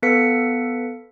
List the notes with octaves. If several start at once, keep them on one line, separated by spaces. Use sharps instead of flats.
B3 A4 B4 F5 B6 C#7